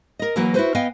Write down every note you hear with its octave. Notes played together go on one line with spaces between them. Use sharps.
A#4 D#5
E3 F#3 A#3 F#4 A#4 B4
E4 F#4 B4 C5
B3 D#5 F5 G5 G#5